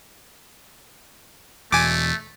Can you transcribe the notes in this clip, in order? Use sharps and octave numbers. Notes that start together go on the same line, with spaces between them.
E2 B2 A3 G#5 D6